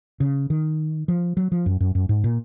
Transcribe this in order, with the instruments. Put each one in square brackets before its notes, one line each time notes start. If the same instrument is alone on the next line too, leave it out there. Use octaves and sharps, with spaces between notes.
[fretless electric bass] C#3
D#3
F3
F#3
F3
F#2
F#2
F#2
G#2
A#2